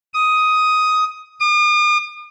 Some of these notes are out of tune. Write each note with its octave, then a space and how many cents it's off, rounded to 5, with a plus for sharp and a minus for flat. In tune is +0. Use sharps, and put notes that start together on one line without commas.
D#6 +10
D#6 -45